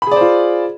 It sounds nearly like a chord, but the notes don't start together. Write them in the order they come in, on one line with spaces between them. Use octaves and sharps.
B5 G#4 D5 C5 F4